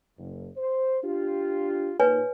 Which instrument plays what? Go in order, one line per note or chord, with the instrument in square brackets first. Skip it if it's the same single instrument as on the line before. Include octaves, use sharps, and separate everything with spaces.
[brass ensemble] F#1
C5
D4 F4 G4
[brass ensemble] A#2 D#4 [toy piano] B4 C#5 G#5